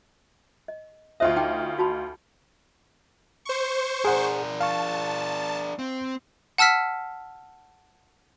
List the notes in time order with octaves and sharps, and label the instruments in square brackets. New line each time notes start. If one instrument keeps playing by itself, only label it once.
[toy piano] D#5
[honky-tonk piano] D2 F4 D#5 [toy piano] C5 E5
[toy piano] D#4 G5 D6
F#4 A5 B5
[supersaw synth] C5 C#6
[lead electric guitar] D4 A#4 [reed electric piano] G#4 F#5
[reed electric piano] F5 C#6 [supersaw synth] A5
[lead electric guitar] C4
[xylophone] F#5 A5 E6 F6 B6